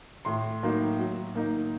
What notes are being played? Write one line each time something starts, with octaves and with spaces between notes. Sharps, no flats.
A2 C6
F#3 A#3 D#4
F#3
A#3 D#4